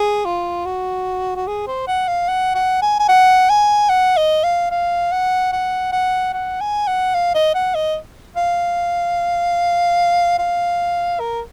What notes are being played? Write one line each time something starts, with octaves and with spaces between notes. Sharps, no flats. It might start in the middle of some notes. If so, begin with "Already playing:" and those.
Already playing: G#4
F4
F#4
F#4
G#4
C5
F#5
F5
F#5
F#5
G#5
G#5
F#5
G#5
F#5
D#5
F5
F5
F#5
F#5
F#5
F#5
G#5
F#5
F5
D#5
F#5
D#5
F5
F5
A#4